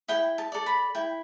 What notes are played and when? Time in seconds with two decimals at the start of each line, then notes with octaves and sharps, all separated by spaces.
0.08 E4 G5
0.38 A5
0.52 A4 D5
0.66 B5
0.95 E4 G5